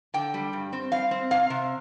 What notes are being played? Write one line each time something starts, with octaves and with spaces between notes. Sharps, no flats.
D3 G5
G3
G2
C4
G3 F5
C4
C3 F5
C3